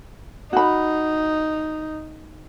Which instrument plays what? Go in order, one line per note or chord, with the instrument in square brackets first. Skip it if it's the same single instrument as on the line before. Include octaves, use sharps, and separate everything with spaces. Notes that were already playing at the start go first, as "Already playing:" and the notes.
[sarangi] D#4 [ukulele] F#4 B5